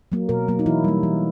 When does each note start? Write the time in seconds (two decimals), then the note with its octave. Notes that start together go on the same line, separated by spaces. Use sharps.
0.12 F#3 A#3
0.29 B2 A#4
0.48 F#3 A#3
0.59 D#4
0.66 E3 E4
0.84 G3 A#3
1.03 E3